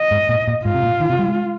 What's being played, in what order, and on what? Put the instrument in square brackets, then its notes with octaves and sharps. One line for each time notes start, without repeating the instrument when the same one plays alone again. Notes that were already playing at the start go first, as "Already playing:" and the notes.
Already playing: [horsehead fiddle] D#5
[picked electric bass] G#2
A#2
A#2
[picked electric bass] G#2 [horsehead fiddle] F4
[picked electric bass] C3
A#2
D#3
C3
G3
G#3